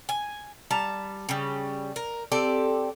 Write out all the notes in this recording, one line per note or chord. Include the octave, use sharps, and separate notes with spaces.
G#5
G3 A5 A#5
C#3 G3
A#4
C4 G4 A4 D5